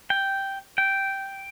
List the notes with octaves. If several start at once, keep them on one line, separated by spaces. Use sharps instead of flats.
G5
G5